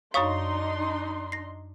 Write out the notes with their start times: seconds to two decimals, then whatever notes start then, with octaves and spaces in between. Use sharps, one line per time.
0.14 F#2 D4 D#4 C#5 F5 C6 C#6 D#6
1.32 A#6 C7